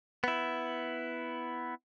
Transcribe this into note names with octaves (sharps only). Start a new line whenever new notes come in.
B3 E4